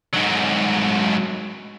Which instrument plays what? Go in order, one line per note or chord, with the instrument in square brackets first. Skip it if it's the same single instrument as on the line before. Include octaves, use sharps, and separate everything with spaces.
[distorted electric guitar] G#2 F#3